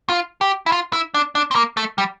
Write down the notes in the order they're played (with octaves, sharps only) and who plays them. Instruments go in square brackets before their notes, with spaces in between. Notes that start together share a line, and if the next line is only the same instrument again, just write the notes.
[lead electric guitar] F4
G4
E4
F4
E4
D4
D4
C4
A#3
A3
G3